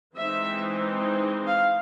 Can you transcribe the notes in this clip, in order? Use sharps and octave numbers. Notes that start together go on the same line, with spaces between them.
E3 G#3 C4 D#4 E5
F5